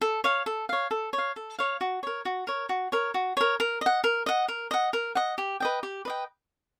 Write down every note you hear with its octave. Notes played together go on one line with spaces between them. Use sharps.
A4
C#5 F5
A4
C#5 F5
A4
C#5
F5
A4
C#5 F5
F#4
A#4 C#5
F#4
A#4 C#5
F#4
A#4 C#5
F#4
A#4 C#5
A#4
D#5 F#5
A#4
D#5 F#5
A#4
D#5 F#5
A#4
D#5 F#5
G4
B4 D#5 G5
G4
B4 D#5 G5